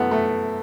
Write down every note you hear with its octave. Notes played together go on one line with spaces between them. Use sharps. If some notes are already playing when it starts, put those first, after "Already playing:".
Already playing: F#2 E3 A3 B3
A3